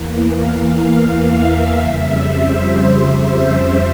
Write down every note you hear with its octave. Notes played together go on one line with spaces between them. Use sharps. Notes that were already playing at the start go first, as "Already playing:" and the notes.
Already playing: E2 E3 A#3
F5
E5
F2 C#3 G3
C5